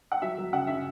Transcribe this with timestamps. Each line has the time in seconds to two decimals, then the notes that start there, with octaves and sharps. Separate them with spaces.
0.12 F#5
0.22 F#3 E5
0.38 F#3
0.53 C#3 F#5
0.67 C#3 E5